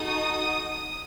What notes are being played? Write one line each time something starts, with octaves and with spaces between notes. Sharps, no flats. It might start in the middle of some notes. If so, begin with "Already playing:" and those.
Already playing: D#4 F#4 A4 D#6